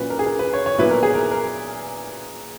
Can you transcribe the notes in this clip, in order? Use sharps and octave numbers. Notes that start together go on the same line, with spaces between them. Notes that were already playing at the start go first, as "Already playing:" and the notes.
Already playing: A#2 F#3 C#4 B4
A#4
G#4
A#4
B4
C#5
C#5
A#2 F#3 B3 E4 B4
A#4
G#4
A#4
A#4